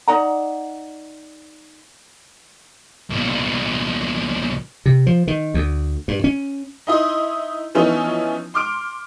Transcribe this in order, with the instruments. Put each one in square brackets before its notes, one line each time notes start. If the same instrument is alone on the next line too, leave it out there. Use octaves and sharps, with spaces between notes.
[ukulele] D#4 D5 F#5 A#5
[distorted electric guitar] C2 A#2
[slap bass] C3
F3
D#3
D2
G2
C#4
[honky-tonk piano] D#4 E4 D#5 C6
E3 F3 B3 C#4 D#4 E4
C6 D6 F6 D7